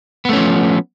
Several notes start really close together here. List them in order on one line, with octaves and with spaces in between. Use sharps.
B3 A3 C#4 F3